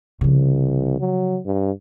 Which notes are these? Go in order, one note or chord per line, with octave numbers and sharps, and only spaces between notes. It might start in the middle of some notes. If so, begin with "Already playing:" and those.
C2 C#3 F3
F#3
G2